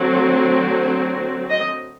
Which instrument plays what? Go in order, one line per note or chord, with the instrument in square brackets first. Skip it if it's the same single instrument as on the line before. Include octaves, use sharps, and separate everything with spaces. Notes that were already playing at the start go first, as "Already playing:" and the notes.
Already playing: [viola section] D3 F#3 A3 C4
D#5